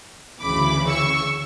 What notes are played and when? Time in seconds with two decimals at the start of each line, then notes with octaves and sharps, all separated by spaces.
0.41 D2 C#3 E3 B5 D6
0.87 C#6 E6